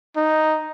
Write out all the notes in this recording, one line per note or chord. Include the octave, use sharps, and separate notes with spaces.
D#4